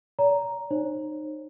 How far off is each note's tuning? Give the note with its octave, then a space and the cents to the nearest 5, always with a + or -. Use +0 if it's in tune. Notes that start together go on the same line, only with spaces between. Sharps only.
D5 -45 A#5 +0
D#4 -30 C5 +40